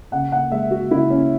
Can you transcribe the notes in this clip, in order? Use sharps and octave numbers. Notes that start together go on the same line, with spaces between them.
C#3 F#5
F#5
G#3 E5
F#4
C#3 E4
C#4